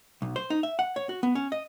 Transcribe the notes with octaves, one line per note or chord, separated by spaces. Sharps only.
B1
C5
D#4
E5
F#5
C#5
F#4
B3
C#4
D#5